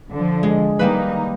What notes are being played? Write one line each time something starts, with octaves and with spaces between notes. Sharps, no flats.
D3 F3
G#3
D#3 G3 A#3 D#4 B4